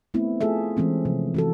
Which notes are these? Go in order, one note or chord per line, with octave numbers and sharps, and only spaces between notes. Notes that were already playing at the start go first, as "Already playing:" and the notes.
A3 B3 C4 E4
A3 F4 G#4 A4 E5
E3 G#3 C4 C#4
C3 F3
E3 F#4 A4